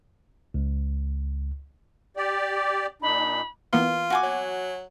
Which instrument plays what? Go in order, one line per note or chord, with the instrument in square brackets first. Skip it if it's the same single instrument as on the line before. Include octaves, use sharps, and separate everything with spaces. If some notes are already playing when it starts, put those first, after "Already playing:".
[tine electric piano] C#2
[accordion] G4 D5
[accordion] A#2 D4 D#4 [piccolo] B5
[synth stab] E3 A#3 B3 [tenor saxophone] F4
[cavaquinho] F#4 G#5 D6
[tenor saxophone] F#3